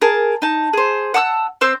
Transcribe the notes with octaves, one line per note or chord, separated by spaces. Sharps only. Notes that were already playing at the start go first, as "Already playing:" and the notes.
G#4 A#4 A5
D#4 A5
G#4 C5
F#5 A5 D#6 E6
C4 C5 E6